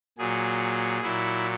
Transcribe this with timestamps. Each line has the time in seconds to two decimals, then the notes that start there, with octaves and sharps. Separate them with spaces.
0.18 A#2 F#3 G#4
1.02 A#2 F#3 E4